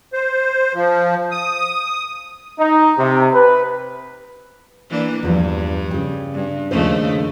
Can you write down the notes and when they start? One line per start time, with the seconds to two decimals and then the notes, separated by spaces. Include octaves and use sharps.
0.13 C5
0.74 F3
1.32 D#6
2.59 D#4
2.98 C3
3.34 B4
4.90 E3 A#3 D4
5.23 E2 G2 F3
5.91 C#3 G3
6.34 G2
6.71 D#2 C#3 F3 A3 D4 C5